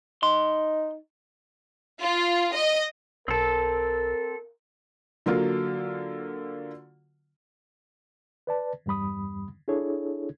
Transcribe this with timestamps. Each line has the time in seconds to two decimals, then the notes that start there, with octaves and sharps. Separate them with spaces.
0.23 D#4 C6
2.02 F4
2.54 D#5
3.28 B1 C4 A4 A#4
5.26 D3 F#3 A#3 F4
8.47 B4 D5 A5
8.86 E2 G2 G3 B5 D#6
9.68 D4 E4 G#4 A4 C#5